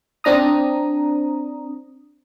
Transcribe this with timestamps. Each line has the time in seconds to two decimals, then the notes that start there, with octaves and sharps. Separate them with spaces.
0.24 C4 D4 A#5 D#6